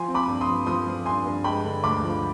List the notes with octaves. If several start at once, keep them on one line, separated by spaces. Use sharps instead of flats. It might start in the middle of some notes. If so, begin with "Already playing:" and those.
Already playing: F3 G#5 C6
C4
B5 D6
G2
C6 D#6
F3
F3 C6 D#6
F3
G2 G#5 C6
G2
G#3 G5 B5
D3
D2 B5 D6
F3